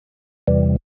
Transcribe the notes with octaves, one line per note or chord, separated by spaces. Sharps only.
E2 C3 E3 G3